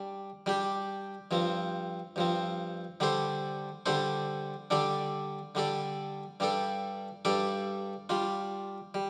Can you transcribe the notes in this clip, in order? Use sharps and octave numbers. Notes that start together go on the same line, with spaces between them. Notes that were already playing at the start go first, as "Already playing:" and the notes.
Already playing: G3 D4
G3 D4 G4
G2 F3 C4
G2 F3 C4
D3 G3 D4 A4 C5
D3 G3 D4 A4 C5
D3 G3 D4 A4 D5
D3 G3 D4 A4 D5
G2 G3 D4 A4 D5
G2 G3 D4 A4 D5
G3 D4 F4
G3